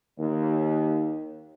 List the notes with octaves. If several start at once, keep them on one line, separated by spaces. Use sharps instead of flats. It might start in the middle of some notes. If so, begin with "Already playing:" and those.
D#2